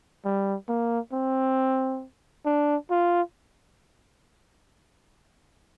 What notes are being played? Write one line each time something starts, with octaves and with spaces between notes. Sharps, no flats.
G3
A#3
C4
D4
F4